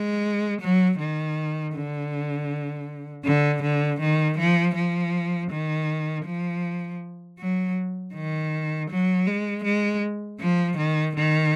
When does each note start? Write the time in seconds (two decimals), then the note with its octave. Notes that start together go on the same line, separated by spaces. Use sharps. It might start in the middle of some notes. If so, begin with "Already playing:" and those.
Already playing: G#3
0.61 F#3
0.99 D#3
1.74 D3
3.25 D3
3.62 D3
4.00 D#3
4.38 F3
4.75 F3
5.50 D#3
6.25 F3
7.39 F#3
8.14 D#3
8.90 F#3
9.27 G#3
9.64 G#3
10.40 F3
10.77 D#3
11.16 D#3